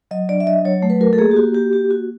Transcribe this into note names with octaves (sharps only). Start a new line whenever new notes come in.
F#3 D#5
D4 D5
E5
F#3 D#5
F#3 C#5
A3
B4
F#4 A#4
A4
A#3 G#4
G4
A#3 F#4
F#4 G4
A#3 G4
F#4